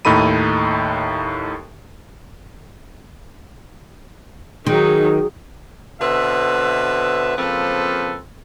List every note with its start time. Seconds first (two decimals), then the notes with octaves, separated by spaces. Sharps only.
0.05 D#2 A2 D#4 A4 B5 D#7
4.67 D#3 F#3 D#4 G#4
6.00 B2 D3 C4 B4 E5
7.36 C#3 F3 A#3 C4 A4 B4